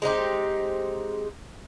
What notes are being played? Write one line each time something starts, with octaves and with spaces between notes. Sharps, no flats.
G#3 C4 D#4 G4